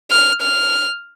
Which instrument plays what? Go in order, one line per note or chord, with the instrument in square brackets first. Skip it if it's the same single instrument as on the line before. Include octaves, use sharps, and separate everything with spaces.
[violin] F6
F6